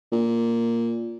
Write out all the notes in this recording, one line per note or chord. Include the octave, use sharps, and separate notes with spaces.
A#2